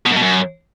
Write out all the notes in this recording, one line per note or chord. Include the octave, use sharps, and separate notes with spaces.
B2
F#2
B2
F#2